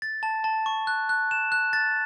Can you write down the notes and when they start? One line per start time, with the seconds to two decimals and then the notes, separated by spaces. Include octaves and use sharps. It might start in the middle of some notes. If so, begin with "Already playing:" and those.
0.02 A6
0.23 A5
0.44 A5
0.66 C#6
0.87 F#6
1.09 F#6
1.31 E7
1.52 F#6
1.73 A6